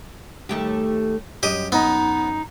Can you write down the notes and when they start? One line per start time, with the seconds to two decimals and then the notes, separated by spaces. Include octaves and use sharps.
0.49 D#2 A3 G4
1.43 F#2 G4 D#5
1.72 B3 D#4